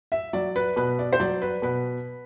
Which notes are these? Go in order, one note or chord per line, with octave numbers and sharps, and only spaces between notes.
E5
F#3 D5
B4
B2 B4
D5
C5
F#3 D5
B4
B2 B4